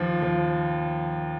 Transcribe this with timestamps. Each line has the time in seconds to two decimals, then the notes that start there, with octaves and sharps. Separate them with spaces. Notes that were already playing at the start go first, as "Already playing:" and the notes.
Already playing: D#2 F3
0.22 F3